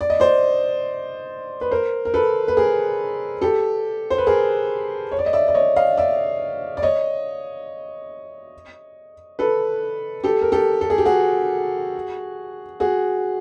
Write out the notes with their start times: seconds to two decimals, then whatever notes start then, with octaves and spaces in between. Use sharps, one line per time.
0.01 D5
0.10 D#5
0.20 C5 D5
1.61 B4
1.71 A#4 C5
2.05 A#4
2.14 A4 B4
2.48 B4
2.57 G#4 A#4
3.41 G4 A4
4.10 C5
4.18 B4
4.27 G#4 A#4
5.12 C#5
5.19 D5
5.26 D#5
5.33 D5 E5
5.48 D5
5.54 C#5 D#5
5.76 D#5 F5
5.97 D5 E5
6.77 D5
6.82 C#5 D#5
9.39 A4 B4
10.24 G4 A4
10.41 A#4
10.52 G4 A4
10.81 A4
10.90 G#4
10.98 G4
11.05 F#4 G#4
12.80 F#4 G#4